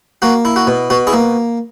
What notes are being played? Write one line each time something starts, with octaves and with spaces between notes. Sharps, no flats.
A#3 F#4
E4
F#4
B2
B2 F#4
E4 G#4
A#3